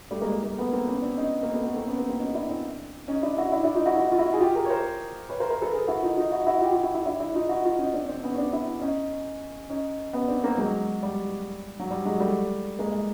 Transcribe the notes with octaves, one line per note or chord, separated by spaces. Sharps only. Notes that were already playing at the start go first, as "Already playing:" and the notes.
G3 A3
G#3 A#3
G3 A3
G#3 A#3
A3 B3
A#3 C4
B3 C#4
C4 D4
C#4 D#4
A#3 C4
A3 B3
A3 B3
A#3 C4
B3 C#4
A#3 C4
A#3 C4
C#4 D#4
D4 E4
C4 D4
C#4 D#4
D4 E4
E4 F#4
D4 E4
D4 E4
D#4 F4
E4 F#4
E4 F#4
F4
E4 F#4
G#4
F4 G4
G#4 A#4
C#5
A#4 C5
B4 C#5
A#4 C5
A#4 C5
A4 B4
G#4 A#4
E4 F#4
D#4 F4
D#4 F4
E4 F#4
E4 F#4
F4 G4
F4 G4
E4 F#4
E4 F#4
D4 E4
D4 E4
D#4 F4
E4 F#4
D#4 F4
C#4 D#4
C4 D4
C4 D4
B3 C#4
C#4
C4 D4
D4 E4
C#4 D#4
C#4 D#4
B3 C#4
C4 D4
A#3 C4
F#3 G#3
G3
F#3
G3
F#3 G#3
G3 A3
G#3 A#3
G#3